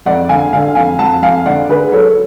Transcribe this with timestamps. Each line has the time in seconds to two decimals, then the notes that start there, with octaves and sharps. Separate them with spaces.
0.06 F2 D5 F#5
0.29 D3 F5 G#5
0.53 D3 F5 G#5
0.75 F2 F5 G#5
0.99 F2 F#5 A5
1.22 F2 F5 G#5
1.46 D3 D5 F#5
1.69 D3 G#4 B4
1.92 F#3 A4 C#5